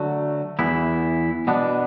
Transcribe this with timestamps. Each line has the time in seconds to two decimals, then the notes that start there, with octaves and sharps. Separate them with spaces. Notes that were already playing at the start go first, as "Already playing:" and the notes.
Already playing: D3 F#3 A3 F#4
0.59 E2 E3 B3 E4
1.47 B2 B3 D4